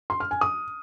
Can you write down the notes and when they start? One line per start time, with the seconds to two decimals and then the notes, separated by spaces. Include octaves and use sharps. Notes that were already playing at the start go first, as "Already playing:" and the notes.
0.10 C6
0.20 F6
0.31 G#5
0.41 D#6